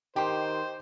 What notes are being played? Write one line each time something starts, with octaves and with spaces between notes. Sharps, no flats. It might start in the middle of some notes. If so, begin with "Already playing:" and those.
D#3 G4 C5 G5 C6